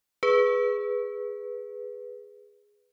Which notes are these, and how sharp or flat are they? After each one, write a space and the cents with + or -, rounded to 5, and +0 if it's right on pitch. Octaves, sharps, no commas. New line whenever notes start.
G#4 -5 B4 +0